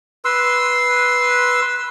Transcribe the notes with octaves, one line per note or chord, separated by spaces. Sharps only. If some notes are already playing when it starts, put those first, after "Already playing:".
B4 C6 E6